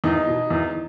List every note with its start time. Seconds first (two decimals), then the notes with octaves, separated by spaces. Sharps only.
0.04 E2 D#4
0.27 B2
0.50 E2